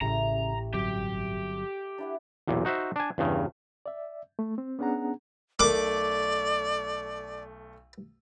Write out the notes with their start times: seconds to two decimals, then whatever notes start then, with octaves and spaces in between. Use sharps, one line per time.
0.01 A1 C#3 G3 A3 A#5
0.74 G1 F#3 C4 G4
1.98 D4 E4 F#5
2.48 B1 E2 A#2
2.65 D#4 F#4 C5 E5
2.96 D4 G#5
3.18 E2 G2 C#3
3.86 D5 E5
4.39 A3
4.58 C4
4.79 B3 C#4 D4 G#4 F#5 A#5
5.60 B1 A3 A#4 D5 D6